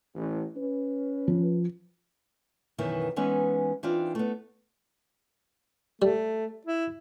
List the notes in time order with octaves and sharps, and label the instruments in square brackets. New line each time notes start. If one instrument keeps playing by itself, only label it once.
[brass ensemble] A1
C#4 B4
[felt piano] F3
[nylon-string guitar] F#2 B2 D#3 E3 B3 E4
E3 G#3 B3 C#4 D#4
E3 C4 D4 D#4 F4
A3 B3
[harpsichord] G3 [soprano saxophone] A3
[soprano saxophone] E4